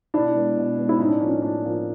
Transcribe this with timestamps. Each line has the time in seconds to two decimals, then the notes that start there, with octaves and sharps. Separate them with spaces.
0.14 B2 D4 E4
0.35 G#3 B3
0.57 B2
0.78 G#3 B3
0.89 E4
0.99 A2 C#4 D#4
1.09 D4
1.20 F3 A#3 C#4
1.30 C#4
1.42 A2 D4
1.63 F3 A#3